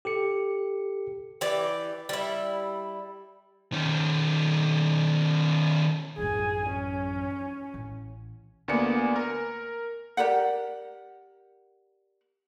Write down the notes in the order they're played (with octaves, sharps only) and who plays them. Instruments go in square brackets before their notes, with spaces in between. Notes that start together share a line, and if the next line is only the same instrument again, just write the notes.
[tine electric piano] G4 A4 C#7
[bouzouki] E3 G4 D5
G3 E4
[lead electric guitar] D#3 C#4
[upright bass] A1 F#2 [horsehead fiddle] G#4 G#5
[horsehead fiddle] C#4
[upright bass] A1
[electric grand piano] D2 A#3 B3 D5 G#5 C#7
A#4
[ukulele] G4 A#4 D5 F#5